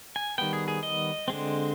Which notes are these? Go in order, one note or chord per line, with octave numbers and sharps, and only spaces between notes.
G#5
D#3 G3 B3 G5
G#4
G#4
D#5
D3 G#3 C4